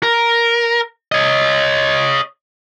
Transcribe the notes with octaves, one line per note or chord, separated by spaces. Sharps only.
A#4
C#5 D#5